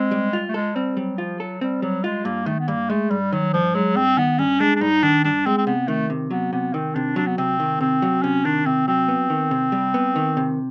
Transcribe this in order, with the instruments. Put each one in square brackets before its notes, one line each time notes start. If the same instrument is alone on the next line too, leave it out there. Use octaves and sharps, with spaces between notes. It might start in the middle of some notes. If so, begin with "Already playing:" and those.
Already playing: [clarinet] G#3 [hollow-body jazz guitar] C4
[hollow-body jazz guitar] G3
F4
[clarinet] A3
[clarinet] G#3 [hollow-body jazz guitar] A4
[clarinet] G3 [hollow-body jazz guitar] C4
[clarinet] F#3 [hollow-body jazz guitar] G3
[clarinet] F3 [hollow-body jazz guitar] F4
[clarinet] F#3 [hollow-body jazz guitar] A4
[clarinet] G3 [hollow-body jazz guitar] C4
[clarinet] F#3 [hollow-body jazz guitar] G3
[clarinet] G#3 [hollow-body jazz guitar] F4
[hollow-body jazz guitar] G2 [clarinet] A#3
[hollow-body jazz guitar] D#3 [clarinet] A3
[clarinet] B3
[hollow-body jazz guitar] G2 [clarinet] A#3
[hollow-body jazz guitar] G#3 [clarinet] A3
[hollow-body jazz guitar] G2 [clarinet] G3
[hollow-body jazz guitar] D#3 [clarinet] F#3
[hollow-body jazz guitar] G2 [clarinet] F3
[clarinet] F#3 [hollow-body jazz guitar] G#3
[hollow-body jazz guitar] G2 [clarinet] C4
[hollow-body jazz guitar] D#3 [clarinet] B3
[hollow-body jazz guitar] G2 [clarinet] C#4
[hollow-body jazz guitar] G#3 [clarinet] D4
[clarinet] D4
[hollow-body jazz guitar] G2 [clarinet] D#4
[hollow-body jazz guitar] D#3 [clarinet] D4
[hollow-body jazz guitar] G2 [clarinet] D4
[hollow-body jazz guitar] G#3 [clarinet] C4
[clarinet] C4
[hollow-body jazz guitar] C3 [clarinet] B3
[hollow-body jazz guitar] D#3 [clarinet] A3
[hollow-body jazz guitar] C3
[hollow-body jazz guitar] F#3 [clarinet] B3
[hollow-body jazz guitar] C3 [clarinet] B3
[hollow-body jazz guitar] D#3 [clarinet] C4
[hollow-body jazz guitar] C3 [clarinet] D4
[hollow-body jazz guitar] F#3 [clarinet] D4
[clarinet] B3
[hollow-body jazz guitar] C3 [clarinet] C4
[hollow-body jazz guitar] D#3
[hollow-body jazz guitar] C3 [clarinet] C4
[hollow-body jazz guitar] F#3
[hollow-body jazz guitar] C3 [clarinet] C#4
[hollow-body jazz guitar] D#3 [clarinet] D4
[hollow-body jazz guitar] C3 [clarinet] C4
[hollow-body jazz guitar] F#3 [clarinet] C4
[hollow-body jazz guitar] B3
D#3
C3
G3
B3
D#3
C3